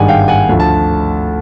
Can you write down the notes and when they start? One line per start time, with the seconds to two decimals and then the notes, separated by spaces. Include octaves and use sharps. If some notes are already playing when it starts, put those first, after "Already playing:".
Already playing: G#1 G2 D#3 G#3 F#5 G#5
0.08 F5 G5
0.28 F#5 G#5
0.49 D2 D3 F3
0.60 A5